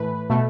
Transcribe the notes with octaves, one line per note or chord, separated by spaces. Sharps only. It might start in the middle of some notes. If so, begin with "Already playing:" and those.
Already playing: A2 E3 A3 B4
B2 A3